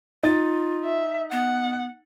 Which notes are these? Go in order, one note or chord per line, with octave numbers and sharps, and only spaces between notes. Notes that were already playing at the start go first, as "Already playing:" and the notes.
D#4 F4 A6
E5
B3 F#5